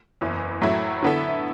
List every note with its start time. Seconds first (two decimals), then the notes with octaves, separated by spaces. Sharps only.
0.21 F#1 E2 E3
0.61 A2 F#3 A3 E4
1.02 D3 B3 E4 A4 E5